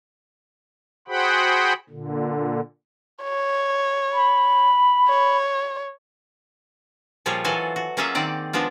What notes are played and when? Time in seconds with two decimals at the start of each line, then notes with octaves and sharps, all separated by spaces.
1.08 F#4 G#4 C5 F#5 G5 B5
1.90 A#2 D3
3.24 C#5
4.13 B5
5.09 C#5
7.26 A#2 F3 G3 F4 G#4 C#5
7.44 E3 F#3 F4 F#4 A4 G#5
7.76 F#4
7.97 F#3 A#3 C#4 F4 G#4 E5
8.15 D#3 C4 D5 F#5
8.53 F3 G#3 B3 D4 F4